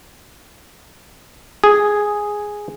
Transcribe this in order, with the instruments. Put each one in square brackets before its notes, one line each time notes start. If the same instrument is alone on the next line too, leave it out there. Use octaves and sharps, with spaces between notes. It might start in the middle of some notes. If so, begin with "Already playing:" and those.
[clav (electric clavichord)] G#4